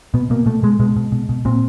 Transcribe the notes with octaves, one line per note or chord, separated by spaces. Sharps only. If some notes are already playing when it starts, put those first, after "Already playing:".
B2 B3
B2 A#3
B2 A3
B2 G#3
B2 G#3
B2
B2
B2
A#2 C4